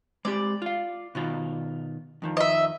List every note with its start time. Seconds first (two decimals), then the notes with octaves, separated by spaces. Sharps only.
0.25 G#3 C4 G4 D5
0.62 F4 F5
1.15 B2 D#3 F4
2.22 F2 D#3 F3
2.37 D#5 E5